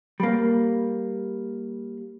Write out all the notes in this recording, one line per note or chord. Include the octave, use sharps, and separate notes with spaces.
G3 A#3